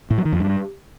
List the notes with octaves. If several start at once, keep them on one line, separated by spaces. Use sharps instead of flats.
A2
F#3
D#3
F2
G2